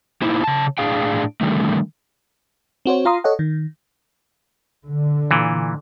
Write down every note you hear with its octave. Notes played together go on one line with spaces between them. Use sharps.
A#3 D#4 E4 C5
C#3 A5
A2 D4 G#4 F5 G5
D3 D#3 G3 A3
C4 F#4 C5 C#5
F4 F5 A#5 C6 D#6
A4 C#5 D#5 F#5
D#3
D3
A#2 E3